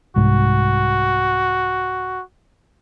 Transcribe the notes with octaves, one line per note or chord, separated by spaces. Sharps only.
C2 G#2 F#4